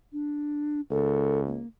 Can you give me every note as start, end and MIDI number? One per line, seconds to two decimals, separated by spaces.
0.12 0.81 62
0.90 1.59 37
0.90 1.40 69
1.47 1.67 58